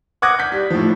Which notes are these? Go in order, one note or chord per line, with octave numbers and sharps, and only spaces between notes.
F#5 D6 D#6 F#6 G#6 A#6
G6 B6
G3
A2 F3